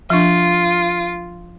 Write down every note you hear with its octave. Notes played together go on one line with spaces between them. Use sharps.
F3 D4 F4